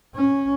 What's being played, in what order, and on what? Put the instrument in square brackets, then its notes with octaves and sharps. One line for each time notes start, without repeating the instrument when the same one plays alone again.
[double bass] C#4